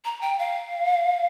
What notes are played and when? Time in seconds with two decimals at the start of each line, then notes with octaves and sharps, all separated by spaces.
0.05 A#5
0.21 G5
0.39 F5